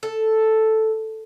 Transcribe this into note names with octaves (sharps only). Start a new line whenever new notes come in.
A4